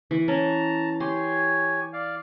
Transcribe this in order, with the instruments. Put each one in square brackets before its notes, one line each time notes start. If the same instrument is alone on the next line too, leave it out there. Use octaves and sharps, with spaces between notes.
[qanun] E3
[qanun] C#4 [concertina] A5 A#5
[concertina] G4 C#5 G#5 [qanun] C6
[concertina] D5 F5